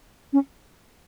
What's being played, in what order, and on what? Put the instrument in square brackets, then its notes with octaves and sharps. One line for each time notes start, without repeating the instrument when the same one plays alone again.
[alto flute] C#4